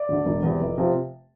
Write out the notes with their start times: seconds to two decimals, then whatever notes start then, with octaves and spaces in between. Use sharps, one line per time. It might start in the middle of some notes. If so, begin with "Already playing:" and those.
Already playing: D5
0.09 D2 D3
0.26 E1
0.43 E2 C3
0.60 F1
0.78 C3 F3